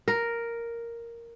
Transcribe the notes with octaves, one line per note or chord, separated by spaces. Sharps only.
A#4